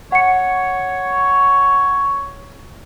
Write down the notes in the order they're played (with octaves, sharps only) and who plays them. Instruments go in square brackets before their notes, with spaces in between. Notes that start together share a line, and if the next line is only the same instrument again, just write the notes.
[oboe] C#5 [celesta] F#5 C#7